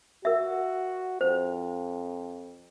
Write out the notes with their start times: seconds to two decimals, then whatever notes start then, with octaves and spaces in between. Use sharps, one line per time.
0.25 F#4 A#4 E5
1.21 F2 C5